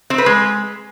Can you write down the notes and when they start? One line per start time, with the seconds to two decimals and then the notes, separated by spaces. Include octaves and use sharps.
0.10 C4
0.18 B4
0.26 G#3